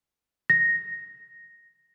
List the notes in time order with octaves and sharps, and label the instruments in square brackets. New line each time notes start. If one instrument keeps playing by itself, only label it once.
[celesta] A#6